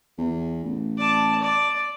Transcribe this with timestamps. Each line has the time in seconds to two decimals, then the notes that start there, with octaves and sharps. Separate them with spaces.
0.18 E2
0.64 A1
0.98 D5 A5
1.41 D5